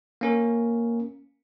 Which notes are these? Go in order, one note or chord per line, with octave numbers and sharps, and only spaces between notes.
A#3 C#4 A#4